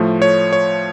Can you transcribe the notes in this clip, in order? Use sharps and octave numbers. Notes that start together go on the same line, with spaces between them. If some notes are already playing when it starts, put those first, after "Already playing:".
Already playing: A2 F3 A3
C#5
C#5